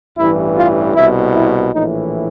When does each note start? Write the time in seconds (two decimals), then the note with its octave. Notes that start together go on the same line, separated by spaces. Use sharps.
0.17 A1 G2 E3 E4
0.57 F4
0.95 C2 B2 E4
1.34 E4
1.72 A#1 A2 E3 D#4